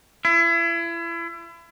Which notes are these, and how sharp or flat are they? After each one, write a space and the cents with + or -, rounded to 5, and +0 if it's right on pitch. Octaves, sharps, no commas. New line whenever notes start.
E4 +35